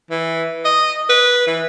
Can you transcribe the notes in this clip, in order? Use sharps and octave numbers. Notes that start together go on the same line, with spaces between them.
E3
D#5
B4
E3